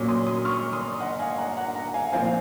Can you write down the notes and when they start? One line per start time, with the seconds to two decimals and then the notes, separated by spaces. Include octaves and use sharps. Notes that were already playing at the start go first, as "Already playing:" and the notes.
Already playing: A#2 F#3 C#4
0.08 C6 D#6
0.27 C6 D#6
0.45 C#6 F6
0.73 C6 D#6
1.00 D#5 F#5
1.19 F5 G#5
1.38 F#5 A#5
1.57 F#5 A#5
1.75 F#5 A#5
1.94 F5 G#5
2.12 A#2 F3 C4 F5 G#5